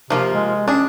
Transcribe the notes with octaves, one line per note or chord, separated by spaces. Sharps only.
C3 F3 A#3 F4
G#3
C#4 D4 G#4